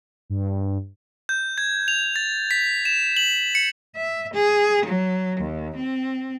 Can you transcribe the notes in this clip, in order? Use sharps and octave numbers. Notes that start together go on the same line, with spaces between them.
G2
G6
G#6
F7
A6
B6
E7
F#7
C#7
E5
G#4
F#3
D#2
C4